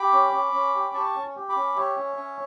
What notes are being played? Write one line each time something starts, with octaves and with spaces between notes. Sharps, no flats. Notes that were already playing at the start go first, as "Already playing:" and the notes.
Already playing: G4 B5 D6
C#4
C#4
C#4
G4
G4 A5 C#6
C#4
G4
B5 D6
C#4
G4 C#5 E5
C#4
C#4